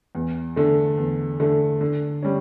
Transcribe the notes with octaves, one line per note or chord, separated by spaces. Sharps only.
E2
D3 A3
E2
D3 A3
D3
G3 C#4